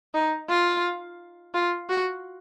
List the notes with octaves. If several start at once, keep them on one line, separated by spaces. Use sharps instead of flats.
D#4
F4
F4
F#4